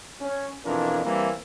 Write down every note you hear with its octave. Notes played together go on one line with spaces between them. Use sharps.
C#4
F2 B2 E3 D4 F4 A#4
E3 G3 A#3 C4 E4